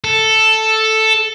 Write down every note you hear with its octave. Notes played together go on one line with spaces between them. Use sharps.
A4